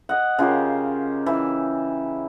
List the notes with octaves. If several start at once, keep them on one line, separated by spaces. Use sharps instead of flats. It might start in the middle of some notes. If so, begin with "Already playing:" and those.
D#5 F#5
C#3 F4 G4 A#4
E3